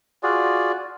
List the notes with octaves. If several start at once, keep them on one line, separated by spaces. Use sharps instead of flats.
F4 F#4 G#4 D5